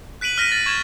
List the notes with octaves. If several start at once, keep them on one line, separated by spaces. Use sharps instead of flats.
F#6 B6 D7 D#7 F#7
F6 A#6 B6 D#7
A6
C#6 G#6 E7